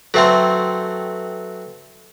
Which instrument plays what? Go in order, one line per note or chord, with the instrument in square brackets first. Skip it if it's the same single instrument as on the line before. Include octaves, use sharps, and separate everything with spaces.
[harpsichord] F#3 A3 C4 [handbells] A4 B4 G5